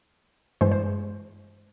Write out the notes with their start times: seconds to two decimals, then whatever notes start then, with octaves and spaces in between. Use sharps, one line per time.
0.61 G2 E3 G#3 C5
0.72 C5